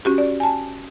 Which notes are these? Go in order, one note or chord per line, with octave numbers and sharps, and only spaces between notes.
C#4 F#4 G4
D5
G#5 A5